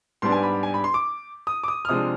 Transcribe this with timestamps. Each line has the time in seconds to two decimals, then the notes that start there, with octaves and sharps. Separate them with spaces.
0.22 G#2 G3 B3 D4 C6
0.32 G#5
0.43 B5
0.63 G#5
0.74 B5
0.84 C6
0.94 D6
1.47 D#6
1.64 D6
1.68 D#6
1.85 F6
1.89 C3 F3 G#3 D4 D#6